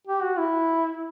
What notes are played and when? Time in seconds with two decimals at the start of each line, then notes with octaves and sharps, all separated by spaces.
0.07 G4
0.23 F#4
0.38 E4